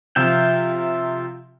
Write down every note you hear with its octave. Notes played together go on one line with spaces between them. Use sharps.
C3 F3 F4 E5 G5